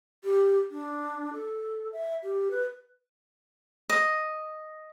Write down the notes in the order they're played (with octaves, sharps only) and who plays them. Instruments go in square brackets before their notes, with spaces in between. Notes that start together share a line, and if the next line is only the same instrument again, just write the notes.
[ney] G4
D4
A4
E5
G4
B4
[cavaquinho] D#5